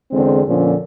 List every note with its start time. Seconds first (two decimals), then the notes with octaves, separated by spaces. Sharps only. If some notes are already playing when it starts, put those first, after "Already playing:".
0.12 E2 D3 G#3 C4
0.48 F2 A#2 D3 F3 C#4